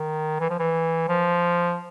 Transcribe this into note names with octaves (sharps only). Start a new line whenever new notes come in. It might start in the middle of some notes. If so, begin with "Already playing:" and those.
Already playing: D#3
E3
F3
E3
F3